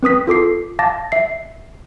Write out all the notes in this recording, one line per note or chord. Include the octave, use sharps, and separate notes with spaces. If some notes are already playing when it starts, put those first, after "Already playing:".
C4 B4 D#6 B6
F4 A4 D6 C7
F5 A5 D6 A6 A#6
E5 C7